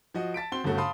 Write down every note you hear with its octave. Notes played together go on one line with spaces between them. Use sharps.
F3 F#4 D#5
A5 A6 B6 D7
C4 F#4 C6 G7
G1 G2 C#3 A3 F#4
F5 A5 B5 C6 D#6